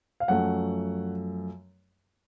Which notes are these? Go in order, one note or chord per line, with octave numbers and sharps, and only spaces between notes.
F5
F#2 F3 A3 F#5